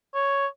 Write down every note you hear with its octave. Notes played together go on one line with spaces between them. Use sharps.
C#5